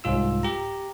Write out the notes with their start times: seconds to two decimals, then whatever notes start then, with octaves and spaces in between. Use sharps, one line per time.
0.04 C2 G#2 F4 E6
0.43 G4 A#5